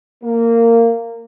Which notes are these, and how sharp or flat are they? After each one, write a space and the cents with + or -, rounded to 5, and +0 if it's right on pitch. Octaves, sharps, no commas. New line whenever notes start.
A#3 -15